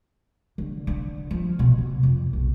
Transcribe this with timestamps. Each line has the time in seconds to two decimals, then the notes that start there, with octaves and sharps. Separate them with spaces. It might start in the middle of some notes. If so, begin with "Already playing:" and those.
0.58 D3
0.87 D3
1.31 F3
1.59 B2
1.78 C3
2.03 F2
2.33 B1